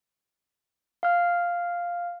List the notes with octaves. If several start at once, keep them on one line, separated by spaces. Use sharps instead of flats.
F5 F6